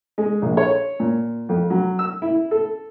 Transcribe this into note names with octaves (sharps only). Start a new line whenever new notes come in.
G#3
A#1
C#5
A#2
F2
F#3
E6
E4
A4